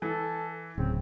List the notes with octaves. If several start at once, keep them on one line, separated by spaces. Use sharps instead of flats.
E3 A4
D1 C#3 C4